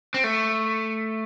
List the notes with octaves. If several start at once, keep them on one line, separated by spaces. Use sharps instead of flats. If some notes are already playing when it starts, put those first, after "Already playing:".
C4
A3